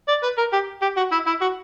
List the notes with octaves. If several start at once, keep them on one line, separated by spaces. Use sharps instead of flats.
D5
B4
A#4
G4
G4
F#4
E4
E4
F#4